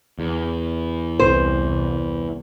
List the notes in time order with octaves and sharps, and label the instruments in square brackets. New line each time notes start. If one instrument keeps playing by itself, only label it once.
[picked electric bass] E2
[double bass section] C2 [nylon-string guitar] C5